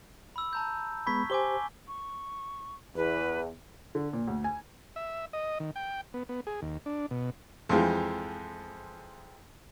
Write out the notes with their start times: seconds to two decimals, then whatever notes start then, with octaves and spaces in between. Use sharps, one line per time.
0.36 B5 E6
0.53 A5 A#5 G6
1.07 G#3 B3 B5 C#6 G#6 B6
1.30 G4 C5 G#5 D6 G7
1.88 C#6
2.96 E2 B4
3.95 D3
4.13 A#2
4.28 D2
4.44 G#5
4.96 E5
5.33 D#5
5.60 D#3
5.76 G5
6.14 B3
6.29 B3
6.47 G#4
6.62 D#2
6.86 D4
7.11 B2
7.69 F2 E3 F3 G#3